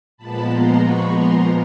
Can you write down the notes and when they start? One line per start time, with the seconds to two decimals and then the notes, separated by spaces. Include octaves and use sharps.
0.17 A#2 F3 G#3 B3 A5 B5
0.49 A#5 C6
0.80 B5 C#6
1.12 A#5 C6